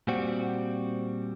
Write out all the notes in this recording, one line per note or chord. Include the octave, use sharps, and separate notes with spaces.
A#2 G3 C4 F#4